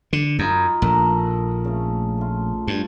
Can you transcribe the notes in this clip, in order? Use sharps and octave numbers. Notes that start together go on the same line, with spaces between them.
D3
F#2 D#4 F4 B5
A#1 A4 A#4 D#5
C#3 A3
A3 F4
G2